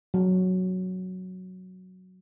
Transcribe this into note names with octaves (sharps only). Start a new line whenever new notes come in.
F#3